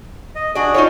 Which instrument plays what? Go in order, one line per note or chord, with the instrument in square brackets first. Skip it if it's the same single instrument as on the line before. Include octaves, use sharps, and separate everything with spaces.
[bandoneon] D#5
[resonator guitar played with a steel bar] D4 D5 [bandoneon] F#4 G#4
[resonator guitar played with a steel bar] D#4 F4 C#5